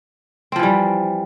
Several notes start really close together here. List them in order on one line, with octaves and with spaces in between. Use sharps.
C4 F3 E3 G3